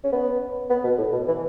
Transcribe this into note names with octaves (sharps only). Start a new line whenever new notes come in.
C#4
B3
B3
B2
A2
B2
E3